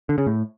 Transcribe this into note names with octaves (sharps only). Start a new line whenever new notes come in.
D3
C#3
A2